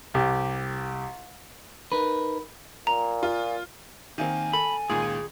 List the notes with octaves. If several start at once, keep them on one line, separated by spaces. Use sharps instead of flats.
C2 G4
D#4 A#4 B4
A#2 A#5
F4
D#3 A#3 C4 G#5
A4 B5
C#2 A#2 D#3 G#4